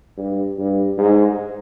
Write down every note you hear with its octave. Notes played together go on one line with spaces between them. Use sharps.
G2
G2
G#2